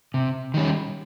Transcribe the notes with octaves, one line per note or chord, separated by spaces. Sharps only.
C3
D#3 G3 C#4